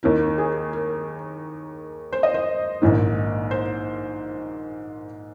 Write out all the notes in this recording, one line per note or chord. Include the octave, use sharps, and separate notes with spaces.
D#2 D#3 A#4
G#4
A#4
C5
D#5
C5
A#1 G#2 D#3
C5